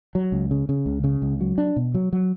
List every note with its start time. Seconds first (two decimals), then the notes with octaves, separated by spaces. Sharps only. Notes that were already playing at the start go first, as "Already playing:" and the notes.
0.15 F#3
0.32 C#2
0.51 C#3
0.69 C#3
0.86 C#2
1.04 C#3
1.22 C#2
1.40 F#3
1.58 D4
1.76 B2
1.95 F#3
2.13 F#3